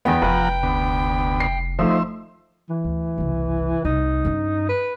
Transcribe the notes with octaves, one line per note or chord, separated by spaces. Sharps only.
E2 B3 G5 B5
F1 F3 B4 F#5 A#5
D2 B3
C7
F3 A3 D#4 C5 E5
E3
D2
F#1 C2
C2 D#4
G2 C#4
B4